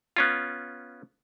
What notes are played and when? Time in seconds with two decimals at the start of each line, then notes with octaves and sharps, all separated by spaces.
0.16 B3 C#4 F4